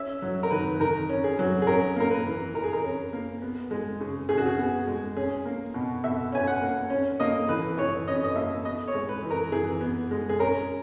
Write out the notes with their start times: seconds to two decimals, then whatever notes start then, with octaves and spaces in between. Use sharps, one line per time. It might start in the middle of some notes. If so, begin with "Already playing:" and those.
Already playing: C#4 E5
0.22 F#3
0.43 A#4
0.51 D#3 B4
0.80 D#3 A#4
1.09 C#4
1.24 G#4
1.39 F#3
1.62 G#4
1.67 C#4 A#4
1.96 A#3 A#4
2.11 B4
2.25 E3
2.54 E3 A#4
2.64 G#4
2.73 A#4
2.83 C#4
3.13 A#3
3.42 B3
3.71 G#3
4.00 C#3
4.29 C#3 G#4
4.38 F#4
4.46 G#4
4.58 B3
4.87 G#3
5.17 C#4 G#4
5.45 A#3
5.74 B2
6.04 B2 E5
6.32 C#4 G#5
6.47 F#5
6.61 A#3
6.90 C#4
7.20 A#3 D#5
7.48 E3 B4
7.77 E3 C#5
8.08 C#4 D#5
8.24 D#5
8.36 A#3 E5
8.65 B3 D#5
8.87 C#5
8.94 G#3
9.09 B4
9.23 E3
9.31 A#4
9.52 E3 G#4
9.81 B3
10.11 G#3
10.29 G#4
10.39 C#4 A#4